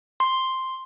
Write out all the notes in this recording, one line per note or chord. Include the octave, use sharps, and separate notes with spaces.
C6